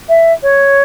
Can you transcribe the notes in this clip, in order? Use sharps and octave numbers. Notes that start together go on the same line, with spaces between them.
E5
C#5